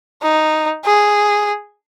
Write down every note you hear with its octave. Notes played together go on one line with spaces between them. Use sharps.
D#4
G#4